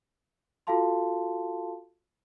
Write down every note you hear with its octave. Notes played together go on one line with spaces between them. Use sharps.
F4 F#4 A4 F5 A5 C6